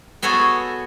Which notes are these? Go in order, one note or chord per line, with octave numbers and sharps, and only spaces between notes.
B3 F#4 G#4 A4 C#5